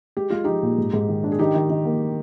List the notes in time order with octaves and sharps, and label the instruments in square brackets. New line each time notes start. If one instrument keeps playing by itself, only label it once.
[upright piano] G#3 [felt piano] G4
[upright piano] G#3 [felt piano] F4
[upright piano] F3 [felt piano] D#4 G4
[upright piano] A#2
G#2
G#2
D#3
D4
[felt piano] G#4
[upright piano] D#3 [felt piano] D#4 G4
[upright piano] D#3
D#3
A#3